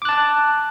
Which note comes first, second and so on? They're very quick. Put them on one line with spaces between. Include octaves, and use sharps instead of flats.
D6 F#6 A5